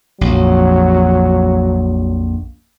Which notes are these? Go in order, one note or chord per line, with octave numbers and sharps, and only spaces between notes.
A#1 F2 F#3